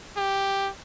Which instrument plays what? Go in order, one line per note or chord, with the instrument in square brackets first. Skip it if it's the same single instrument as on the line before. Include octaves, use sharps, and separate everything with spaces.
[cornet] G4